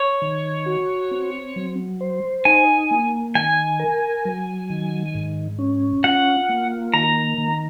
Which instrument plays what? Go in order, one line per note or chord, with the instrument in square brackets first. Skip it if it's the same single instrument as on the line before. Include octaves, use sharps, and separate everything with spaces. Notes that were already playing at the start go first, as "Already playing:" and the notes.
Already playing: [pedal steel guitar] C#5
[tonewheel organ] D#3
F#4
C4
F#3
C5
[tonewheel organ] D#4 [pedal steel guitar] G#5
[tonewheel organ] A#3
[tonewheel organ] D#3 [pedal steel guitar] G#5
[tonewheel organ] A#4
F#3
D#3
G#2
C#4
[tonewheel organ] F4 [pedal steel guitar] F#5
[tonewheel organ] A#3
[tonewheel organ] D#3 [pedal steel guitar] A#5
[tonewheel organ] D#3